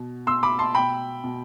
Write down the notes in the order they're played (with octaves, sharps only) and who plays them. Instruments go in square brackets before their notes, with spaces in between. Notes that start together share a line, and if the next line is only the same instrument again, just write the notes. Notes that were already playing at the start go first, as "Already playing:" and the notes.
Already playing: [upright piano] B2
B2 C6 E6
B5 D6
A5 C6
B2 G5 B5
B2